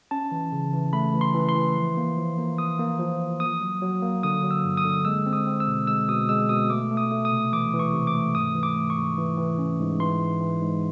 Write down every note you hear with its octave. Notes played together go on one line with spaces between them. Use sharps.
C#4 A5
E3
C#3
E3
A3 B5
E3
C6
E3
C6
E3
F3
A#3
F3
A#3
A#3 D#6
A#3
F3
F3
A#3 D#6
F#3
F#3
A#3
D3 D#6
F#3
E6
G2
D#6
D3
G#3 E6
C4
D#6
C4
E6
B2
G#3 E6
B2 D#6
G#3 E6
B2 D#6
A3 D6
A3
D#6
A3
D#6
C3
E3 D6
E3
C#6
C3
D6
A3
G#2 D#6
E3
D6
A3
C#6
G#2
E3
E3
C#4
G#2
E3 C6
E3
E3
G#2